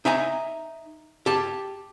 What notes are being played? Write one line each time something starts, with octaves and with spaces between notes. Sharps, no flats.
D#4 E5 G#5 A#5
G4 A5